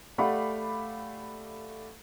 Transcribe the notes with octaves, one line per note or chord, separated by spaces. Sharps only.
A3 G4 D5 F5 F#5 B5